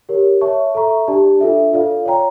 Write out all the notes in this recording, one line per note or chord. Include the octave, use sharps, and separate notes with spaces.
G4 A#4 C#5
C#5 E5 A5 C#6
A4 E5 A#5 C#6
D4 G4 D5 A5
D4 F4 A4 E5
F4 A4 D5 F5
C#5 G5 A#5